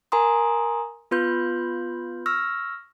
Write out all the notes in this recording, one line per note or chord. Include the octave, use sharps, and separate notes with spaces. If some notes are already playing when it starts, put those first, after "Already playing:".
A#4 G#5 A#5 C6 D#6
B3 F4 B4 C6 G6
C#6 E6 F6 A#6